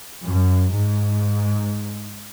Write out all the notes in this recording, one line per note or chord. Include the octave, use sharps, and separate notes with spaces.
F#2
G#2